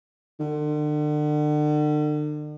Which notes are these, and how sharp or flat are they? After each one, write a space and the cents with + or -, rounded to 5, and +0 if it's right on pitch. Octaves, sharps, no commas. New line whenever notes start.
D3 +40